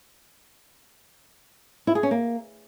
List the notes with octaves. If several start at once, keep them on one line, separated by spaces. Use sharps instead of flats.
E4
G#4
C#4
A#3